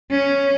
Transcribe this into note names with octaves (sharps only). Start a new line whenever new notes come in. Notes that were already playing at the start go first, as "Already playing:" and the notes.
C#4